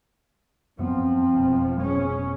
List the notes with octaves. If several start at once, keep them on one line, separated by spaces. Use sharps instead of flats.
F#2 F3 B3 C4
F1 B2
C#4 G#4